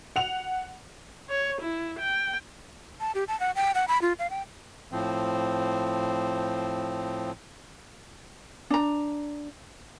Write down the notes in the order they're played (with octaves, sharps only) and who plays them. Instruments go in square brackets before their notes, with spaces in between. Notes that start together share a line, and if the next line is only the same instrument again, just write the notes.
[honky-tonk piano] F#5 F7
[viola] C#5
E4
G5
[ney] A5
G4
A5
F#5
G5
F#5
B5
F4
F5
G5
[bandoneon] A2 F3 C4
[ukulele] D4 A#5